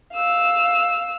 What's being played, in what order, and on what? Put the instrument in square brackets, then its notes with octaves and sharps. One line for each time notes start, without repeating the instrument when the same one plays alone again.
[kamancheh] F5 E6